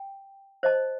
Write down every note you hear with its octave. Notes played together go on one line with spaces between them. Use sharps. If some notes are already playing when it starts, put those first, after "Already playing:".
Already playing: G5
C5 D#5 A5